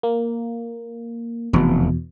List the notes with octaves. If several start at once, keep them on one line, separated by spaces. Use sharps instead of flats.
A#3
F1 E2 B2